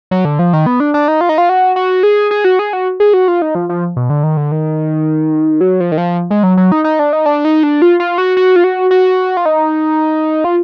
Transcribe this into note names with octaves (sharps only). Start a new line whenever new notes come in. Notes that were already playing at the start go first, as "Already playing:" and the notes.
F#3
D3
F3
D#3
B3
D4
D4
D#4
F4
D#4
F4
F#4
F#4
G#4
G#4
F#4
G#4
F#4
G#4
F#4
F4
D#4
F3
F3
B2
D3
D#3
D3
D#3
F#3
F3
D#3
F3
G#3
F#3
F#3
D#4
D#4
D4
D#4
D4
D#4
D4
F4
F4
F#4
F#4
F4
F#4
F#4
F4
D#4
F4